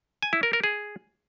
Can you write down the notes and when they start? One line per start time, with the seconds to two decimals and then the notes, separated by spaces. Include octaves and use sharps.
0.22 G#5
0.33 E4
0.43 A#4
0.53 A#4
0.64 G#4